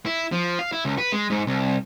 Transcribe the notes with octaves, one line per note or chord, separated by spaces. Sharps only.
E4
F3
F5
E4
C#2
B4
G#3
G#2
C2